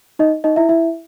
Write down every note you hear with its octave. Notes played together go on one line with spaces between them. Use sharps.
D#4 D#5
D#4 D#5
E4 E5
E4 E5